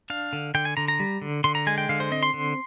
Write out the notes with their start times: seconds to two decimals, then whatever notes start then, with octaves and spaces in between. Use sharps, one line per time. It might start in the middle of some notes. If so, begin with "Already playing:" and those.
0.10 D4 F5
0.33 D3
0.55 D3 G5
0.65 G#5
0.77 D3 A#5
0.88 A#5
1.00 G3
1.22 D3
1.44 D3 C6
1.55 A#5
1.67 G#3 G#5
1.78 G5
1.89 D3 F5
2.00 C5
2.11 C4 D#5
2.23 C6
2.34 D3